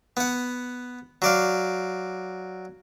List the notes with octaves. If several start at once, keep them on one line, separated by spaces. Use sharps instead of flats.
B3 F#5
F#3 D5 F5